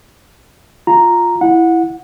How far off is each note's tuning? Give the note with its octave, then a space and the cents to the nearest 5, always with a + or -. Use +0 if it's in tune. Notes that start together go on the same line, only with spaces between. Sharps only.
F4 +5 A#5 +0
E4 +5 F#5 -20